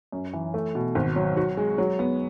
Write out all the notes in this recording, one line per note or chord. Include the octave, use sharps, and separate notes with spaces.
F#2
E3
A3
B2
G#1
F#3
F#4
G#3
F#3
B3